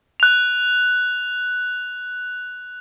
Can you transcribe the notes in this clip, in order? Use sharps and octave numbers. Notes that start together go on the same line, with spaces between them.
F#6 F7